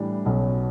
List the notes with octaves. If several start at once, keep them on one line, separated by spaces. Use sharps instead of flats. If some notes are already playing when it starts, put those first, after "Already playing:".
Already playing: A2 E3 G3 D4
B1 B2 F#3 C#4